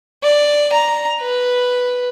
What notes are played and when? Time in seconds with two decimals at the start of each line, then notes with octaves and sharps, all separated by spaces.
0.23 D5
0.72 A#5
1.21 B4